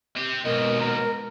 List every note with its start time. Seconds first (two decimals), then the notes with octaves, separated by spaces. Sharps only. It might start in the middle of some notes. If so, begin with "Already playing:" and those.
0.16 C4 G4
0.45 D#2 G#2 B2 G#3 A#4 D#5
0.80 A#5